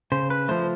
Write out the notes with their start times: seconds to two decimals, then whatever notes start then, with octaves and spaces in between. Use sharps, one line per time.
0.12 C#3 C5
0.30 B4
0.48 F3 A3 C5